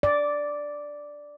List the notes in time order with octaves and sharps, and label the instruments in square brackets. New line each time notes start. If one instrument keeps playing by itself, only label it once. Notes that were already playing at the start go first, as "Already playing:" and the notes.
[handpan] D5